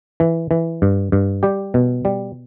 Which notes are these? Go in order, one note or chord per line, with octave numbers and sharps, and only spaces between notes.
E3
E3
G2
G2
G3 G4
B2
G3